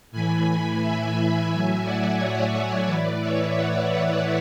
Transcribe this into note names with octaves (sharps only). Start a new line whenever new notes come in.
A2 E3 G#5 B5
E5 G#5
A2 F#3
D5 F#5
C#5 E5
C#5 E5
A2 E3 B4 D5
C#5 E5
D5 F#5
B4 D5